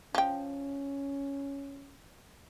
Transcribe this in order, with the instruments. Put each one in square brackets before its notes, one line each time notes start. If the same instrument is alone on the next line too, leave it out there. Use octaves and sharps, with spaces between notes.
[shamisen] F3 G5 [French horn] C#4